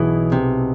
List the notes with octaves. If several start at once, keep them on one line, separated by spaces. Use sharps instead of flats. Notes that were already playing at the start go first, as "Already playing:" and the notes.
Already playing: B1 B2 E3 B3 E4 G#4
C3